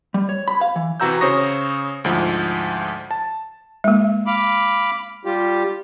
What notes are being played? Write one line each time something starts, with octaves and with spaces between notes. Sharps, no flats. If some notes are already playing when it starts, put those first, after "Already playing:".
G3
C#5
B5
F5
E3
C3 E3 F#4 A#5 E6 G6
C#3 C5 C#5 C#6 D#6 A#6
D2 G#2 F3
A5
G#3 A#3
F5 B5 D6
G3 F4 G4